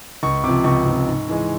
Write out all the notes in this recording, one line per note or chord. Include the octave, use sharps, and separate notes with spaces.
C#2 C#6
C3 F3 D6
C#2 C#6
C3 F3
G#2
E3 G#3